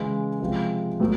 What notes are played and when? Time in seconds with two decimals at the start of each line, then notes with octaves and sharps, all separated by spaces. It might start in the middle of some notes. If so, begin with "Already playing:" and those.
Already playing: C#3 E3 G#3
0.40 C3 F3 G#3
1.00 A2 F#3 B3